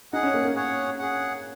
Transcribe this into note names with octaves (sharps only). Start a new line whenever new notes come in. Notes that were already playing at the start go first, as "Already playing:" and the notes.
D#4 G#4 F#5
C#4
A#3
A#3
G#4 C#5 F#5
G#4 F#5